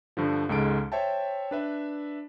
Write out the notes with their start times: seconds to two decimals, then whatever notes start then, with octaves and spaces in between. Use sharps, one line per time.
0.17 G2 D3 F3
0.49 C#2 G#2 G#3 A4 A5 D7
0.92 C5 C#5 E5 G5 A5
1.51 D4 B4 E5